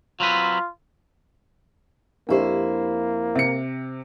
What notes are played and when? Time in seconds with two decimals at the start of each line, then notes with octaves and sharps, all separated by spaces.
0.20 F#3 C4 F4 B4
2.29 F2 A#3 D4 E4 G4 C5
3.36 C3 E5 C#7